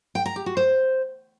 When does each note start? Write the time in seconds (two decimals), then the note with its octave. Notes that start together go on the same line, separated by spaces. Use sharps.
0.15 G5
0.26 A#5
0.36 G4
0.46 F#4
0.57 C5